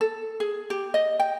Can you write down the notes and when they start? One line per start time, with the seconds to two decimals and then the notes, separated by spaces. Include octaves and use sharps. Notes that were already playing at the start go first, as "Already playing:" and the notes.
0.01 A4
0.40 G#4
0.70 G4
0.94 D#5
1.20 G5